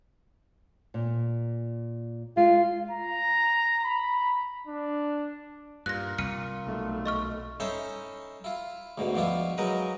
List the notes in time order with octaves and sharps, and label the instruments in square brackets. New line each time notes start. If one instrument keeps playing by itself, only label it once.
[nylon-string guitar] A#2
[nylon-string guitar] G#3 [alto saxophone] F4
[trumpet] A#5
B5
D4
[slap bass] G2 [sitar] A#2 [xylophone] F#6 A#6
[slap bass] C2 [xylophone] F6 C#7 D#7
[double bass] B1 A3
[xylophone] D#5 C#6 F6
[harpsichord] C#4 D#4 E4 A4 C5 C#5
E4 F4
D2 G#2 B2
B2 F3 D4 E4 F4
F#3 G#3 D#4 A#4 B4